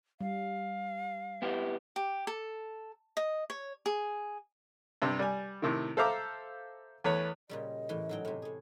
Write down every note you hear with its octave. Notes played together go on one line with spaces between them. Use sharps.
G3 F5
B3 E4 G4
G4
A4
D#5
C#5
G#4
G2 C3 G3
G3 G#5
A2 C3 D#3
A4 C5 E5 F5 A#5 D6
E2 A3 B4 C#5
A#2 C#3 G3 D#5
A2 E3
G#2 F#3 G5
A2 C3
A2 G#4